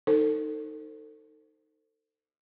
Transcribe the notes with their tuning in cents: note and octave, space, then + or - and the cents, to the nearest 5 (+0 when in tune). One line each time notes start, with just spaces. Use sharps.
D#4 +0 A4 +30 C5 +0